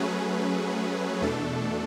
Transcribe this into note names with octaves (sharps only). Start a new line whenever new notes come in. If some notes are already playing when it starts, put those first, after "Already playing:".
Already playing: F#3 A3 C#4 G#4 B4
E2 B2 A3 D4 A4